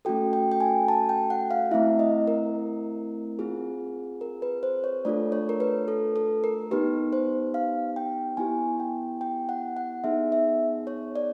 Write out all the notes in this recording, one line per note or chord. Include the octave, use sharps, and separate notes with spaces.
A3 C#4 F#4 A4 G5
G5
G5
G#5
A5
G5
F#5
F5
A3 C4 E4 E5
D#5
A#4
C4 F4 G#4
A#4
B4
C5
C#5
A3 D4 F4 A4 D5
C#5
A#4
B4
A4
A4
A#4
B3 D#4 G4 B4
C5
F5
G5
B3 E4 G4 G#5
G5
G5
F#5
F#5
B3 D#4 G#4 E5
E5
C#5
D5